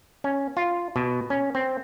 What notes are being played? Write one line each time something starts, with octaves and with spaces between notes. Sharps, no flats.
C#4
F4
B2
C#4
C4